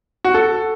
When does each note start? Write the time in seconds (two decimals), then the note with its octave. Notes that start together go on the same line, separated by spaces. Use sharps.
0.25 F#4
0.34 A4